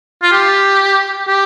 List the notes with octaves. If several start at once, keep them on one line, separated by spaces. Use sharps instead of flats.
F4
G4
G4